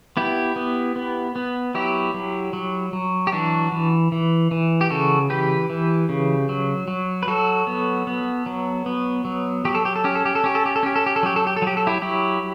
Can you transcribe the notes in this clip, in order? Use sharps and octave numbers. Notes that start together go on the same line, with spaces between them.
B3 E4 G4
B3
B3
B3
F#3 E4 G4
F#3
F#3
F#3
G4
E3 D4 F#4
E3
E3
E3
G4
C#3 F#4 A4
E3 G4 B4
E3
C#3
F#3
F#3
B4
F#3 F#4 A4
B3
B3
F#3
B3
F#3
F#3 G4
A4
G4
A4
C#4 G4
A4
G4
A4
C#4 G4
A4
G4
A4
C#4 G4
A4
G4
A4
F#3 G4
A4
G4
A4
F#3
G4
A4
E4 G4
F#3 E4 G4